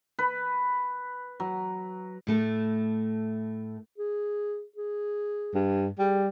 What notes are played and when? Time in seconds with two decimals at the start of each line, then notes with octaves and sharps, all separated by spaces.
0.19 B4
1.40 F#3
2.27 A2 A3 A4
3.98 G#4
4.76 G#4
5.55 G2
5.99 G3 G#4